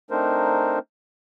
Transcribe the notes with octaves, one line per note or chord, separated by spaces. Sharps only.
A3 C4 D4 D#4 A#4 C5